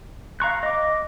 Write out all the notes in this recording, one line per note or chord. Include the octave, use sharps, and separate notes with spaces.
F5 A#5 C#6 F#6
D#5 D6